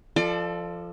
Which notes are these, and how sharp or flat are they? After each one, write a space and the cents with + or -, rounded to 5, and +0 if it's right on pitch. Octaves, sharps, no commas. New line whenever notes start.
F3 -15 A4 +0 D5 +35